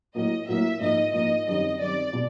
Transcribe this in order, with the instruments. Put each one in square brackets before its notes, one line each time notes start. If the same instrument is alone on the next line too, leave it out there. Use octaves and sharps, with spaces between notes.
[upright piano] A2 F#3 A#3 [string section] D#5
[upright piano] A2 F#3 A#3 [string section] E5
[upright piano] G#2 F3 A#3 D#4 [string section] D#5
[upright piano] G#2 F3 A#3 D#4 [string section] D#5
[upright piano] F#2 D#3 G3 C4 [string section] D#5
[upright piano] F#2 D#3 G3 C4 [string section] D5
[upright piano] B2 G#3 B3